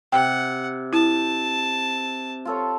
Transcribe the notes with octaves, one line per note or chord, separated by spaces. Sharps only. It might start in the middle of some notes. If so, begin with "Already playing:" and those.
C3 F#5 G5
E4 A5
F4 A4 C#5